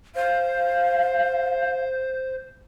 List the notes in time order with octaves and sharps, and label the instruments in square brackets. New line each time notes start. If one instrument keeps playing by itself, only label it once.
[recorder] C5 [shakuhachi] F5